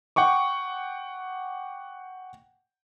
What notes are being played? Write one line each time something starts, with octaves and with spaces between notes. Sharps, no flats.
F#5 G5 C#6 D6